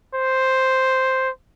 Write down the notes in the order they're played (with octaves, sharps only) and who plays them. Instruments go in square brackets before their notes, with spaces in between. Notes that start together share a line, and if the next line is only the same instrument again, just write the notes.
[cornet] C5